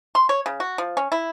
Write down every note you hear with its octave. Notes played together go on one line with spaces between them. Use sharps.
C6
C#5
C#3
F#4
F3
C#4
E4